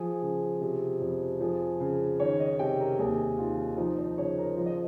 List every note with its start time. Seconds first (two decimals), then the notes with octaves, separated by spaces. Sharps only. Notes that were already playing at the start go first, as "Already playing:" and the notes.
Already playing: F3 G#4
0.22 C#3
0.61 C3
1.01 F2
1.41 F3 G#4
1.80 C#3
2.20 D#3 C#5
2.40 D#5
2.59 C3 G5
2.79 A#4
2.99 D#2 G#4
3.38 D#3 F4
3.77 F3 D#4
3.98 C5
4.18 C#3 C#5
4.38 A#4
4.57 F3
4.66 D#5